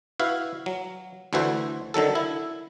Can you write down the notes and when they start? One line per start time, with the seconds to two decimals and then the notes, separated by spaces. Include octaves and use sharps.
0.20 E4 F#4 B4 F5
0.66 F#3
1.33 D2 D3 E3 E4 F#4 C5
1.94 D3 D#3 F#3 A4
2.15 E4